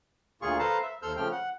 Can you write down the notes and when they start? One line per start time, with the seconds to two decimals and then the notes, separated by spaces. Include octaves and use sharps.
0.42 D2 A#2 F4 G#4 C#6
0.59 A4 B4 C5 F5 A5 A#5
0.83 E5
1.02 D#2 A4 C5 E6 F6 G6
1.16 C#3 F3 A3 G5 F6
1.32 F#5